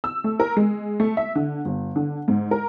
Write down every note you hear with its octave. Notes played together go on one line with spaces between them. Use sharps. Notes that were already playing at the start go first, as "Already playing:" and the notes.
E6
A3
A#4
G#3
A3
E5
D3
G1
D3
G#2
A#4